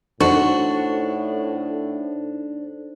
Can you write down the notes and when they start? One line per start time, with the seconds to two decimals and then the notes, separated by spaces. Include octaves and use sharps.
0.21 A2 D4 D#4 F#4 A4 C5